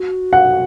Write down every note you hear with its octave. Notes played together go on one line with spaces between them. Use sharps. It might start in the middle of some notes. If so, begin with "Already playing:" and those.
Already playing: F#4
F#5